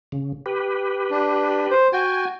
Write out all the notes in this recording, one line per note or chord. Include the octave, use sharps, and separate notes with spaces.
C#3
G4 B4
D4
C5
F#4 G5 G#5